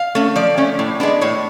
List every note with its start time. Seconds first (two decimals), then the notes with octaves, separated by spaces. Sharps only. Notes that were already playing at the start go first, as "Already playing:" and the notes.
Already playing: F5
0.15 A3 C#4
0.36 F3 D5
0.57 A3 C#4
0.79 A2
1.00 G#3 B3 D4
1.21 A2 C#5